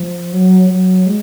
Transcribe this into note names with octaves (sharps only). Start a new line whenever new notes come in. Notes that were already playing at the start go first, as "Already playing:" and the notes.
Already playing: F3
F#3
F#3
G#3